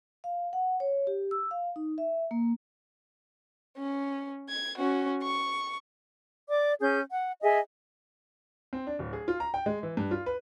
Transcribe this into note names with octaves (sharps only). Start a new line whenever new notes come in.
F5
F#5
C#5
G4
E6
F5
D#4
E5
A#3
C#4
G#6
C#4 F#4
C#6
D5 D6
C#4 G#4 G6
F#5
G#4 D#5 E5 G#5
C4
D4
D1
G#4
F4
A#5
G5
G#3
E3
G2
F4
B4